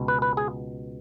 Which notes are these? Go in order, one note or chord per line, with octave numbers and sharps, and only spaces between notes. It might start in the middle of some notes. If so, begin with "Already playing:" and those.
Already playing: C#2 B2
B4
B4
G#4